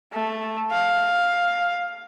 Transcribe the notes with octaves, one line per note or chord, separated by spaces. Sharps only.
A3
F5